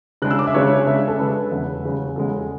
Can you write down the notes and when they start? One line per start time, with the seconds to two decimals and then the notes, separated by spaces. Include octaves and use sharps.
0.22 C#3 G#3 D4 F#6
0.31 E6
0.39 D6
0.47 E5
0.54 C#3 G#3 D4 C#5
0.86 C#3 G#3 D4 E5
1.08 A4
1.19 C#3 G#3 D4 B4
1.51 E2 C#3 G#3
1.83 E2 C#3 G#3
2.15 E2 C#3 G#3 A4